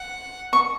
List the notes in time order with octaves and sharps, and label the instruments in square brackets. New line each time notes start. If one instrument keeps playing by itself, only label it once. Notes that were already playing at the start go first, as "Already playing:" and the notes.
Already playing: [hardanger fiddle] F#5
[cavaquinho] C#6